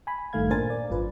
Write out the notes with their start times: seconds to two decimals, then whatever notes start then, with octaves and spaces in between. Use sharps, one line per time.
0.07 G#5 B5
0.33 A1 G2 D#3 A3 F5 G#6
0.50 A#2 D4 A#4 C5 G#5 A6
0.70 D5
0.90 G#1 F#2 F4 B4